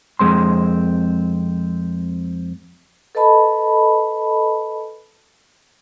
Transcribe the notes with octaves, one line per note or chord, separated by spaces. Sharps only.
F2 G#3 C4 C6
A4 B4 D#5 A5 B5